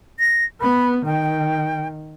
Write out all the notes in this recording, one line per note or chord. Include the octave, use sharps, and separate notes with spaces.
A#6
B3 B5
D#3 G5